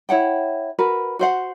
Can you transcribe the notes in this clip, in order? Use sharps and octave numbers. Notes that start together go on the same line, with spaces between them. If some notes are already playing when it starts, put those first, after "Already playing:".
E4 C#5 F#5 G5
F#4 A#4 B4
F#4 C5 F#5